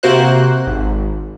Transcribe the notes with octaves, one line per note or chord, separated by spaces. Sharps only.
C3 A#3 F#4 C5 F#6
G#1